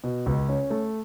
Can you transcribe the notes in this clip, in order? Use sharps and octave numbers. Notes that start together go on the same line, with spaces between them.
B2
C#2
C#4
A3